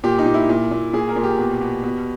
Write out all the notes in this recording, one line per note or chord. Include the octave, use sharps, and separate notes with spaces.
A#2 G4
D#4
A#2
E4
A#2
A#2
A#2 G#4
A#4
A#2
G4
B2
B2
B2